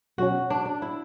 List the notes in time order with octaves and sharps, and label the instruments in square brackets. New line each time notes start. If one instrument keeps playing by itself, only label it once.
[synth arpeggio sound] B2 F#3 C#4 [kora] F#4
[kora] D4
D4
E4